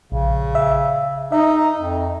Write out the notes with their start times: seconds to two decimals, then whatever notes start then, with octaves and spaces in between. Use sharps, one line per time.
0.12 A#1 C#3
0.55 E5
1.32 D#4 E5
1.79 F2